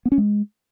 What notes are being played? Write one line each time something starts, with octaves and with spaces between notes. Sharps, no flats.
B3
C#4
G#3